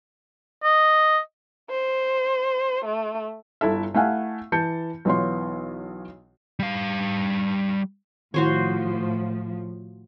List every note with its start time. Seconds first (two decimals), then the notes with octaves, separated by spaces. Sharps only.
0.64 D#5
1.70 C5
2.85 A3
3.61 G1 E4 A4 E5
3.94 A3 E4 F5 F#5 G#5
4.52 E3 A5 G6 C#7
5.05 B1 E3 B3 F4 C#5 C6
6.59 G3 F5
8.34 A2 D#3 F3 E4 F#4 C5 C#5